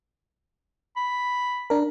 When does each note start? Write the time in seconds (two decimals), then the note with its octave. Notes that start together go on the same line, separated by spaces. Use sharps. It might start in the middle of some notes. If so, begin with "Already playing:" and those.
0.96 B5
1.70 D4 A#4